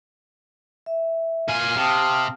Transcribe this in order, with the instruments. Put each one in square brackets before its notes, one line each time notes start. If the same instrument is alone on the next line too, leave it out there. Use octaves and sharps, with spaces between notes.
[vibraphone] E5
[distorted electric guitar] A#2 G#5 [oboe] F5
[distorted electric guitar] C3 [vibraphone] G5 A5 D#6